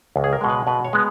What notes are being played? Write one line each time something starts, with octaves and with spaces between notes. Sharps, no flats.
C#2
G#4
A#4
B2 G#3
B4
B2 B4
C#5
G#3 B3